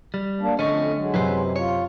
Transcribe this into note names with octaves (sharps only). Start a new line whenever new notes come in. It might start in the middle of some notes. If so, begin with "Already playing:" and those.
G3
A#3 D4
F2 D3 A3 C#4 D#5 C#6
F#3 G#3
F#2 C3 E4 B4 C5
F4 C#5